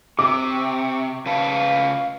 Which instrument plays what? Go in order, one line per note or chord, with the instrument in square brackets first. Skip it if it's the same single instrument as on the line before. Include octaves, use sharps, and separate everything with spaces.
[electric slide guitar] C3 [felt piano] D6
[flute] C#6
[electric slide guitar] C#3 B4 A5 [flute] F5